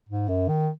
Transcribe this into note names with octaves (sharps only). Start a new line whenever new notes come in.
G#2
F#2
D#3